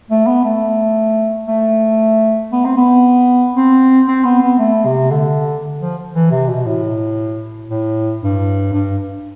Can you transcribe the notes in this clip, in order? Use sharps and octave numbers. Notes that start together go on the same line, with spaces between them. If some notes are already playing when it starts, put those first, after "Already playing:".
A3
B3
A3
A3
B3
C4
B3
C4
C4
B3
B3
A3
C3
D3
F3
E3
C3
B2
A2
A2
G2
G2